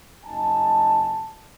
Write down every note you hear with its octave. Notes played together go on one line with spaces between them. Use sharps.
F#1 D#4 G#5 A5